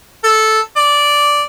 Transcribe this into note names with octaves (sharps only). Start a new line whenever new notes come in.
A4
D5